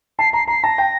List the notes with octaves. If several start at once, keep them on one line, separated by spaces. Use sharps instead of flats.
A5 C7
A#5 C7
A#5 C7
A5 A#6
G5